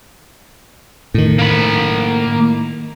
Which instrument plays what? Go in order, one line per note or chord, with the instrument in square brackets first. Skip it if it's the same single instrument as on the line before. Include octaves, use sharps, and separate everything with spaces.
[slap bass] A2 D#3
[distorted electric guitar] A#3 B5